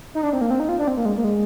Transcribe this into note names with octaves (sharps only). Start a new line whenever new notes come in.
D#4
D4
C4
A#3
C4
D#4
F4
D4
C4
A#3
G#3
A#3
G#3